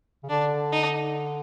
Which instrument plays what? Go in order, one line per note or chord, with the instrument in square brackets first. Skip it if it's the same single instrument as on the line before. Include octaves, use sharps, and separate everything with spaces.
[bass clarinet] C#3
[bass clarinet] D3 [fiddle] D4
[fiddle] D#4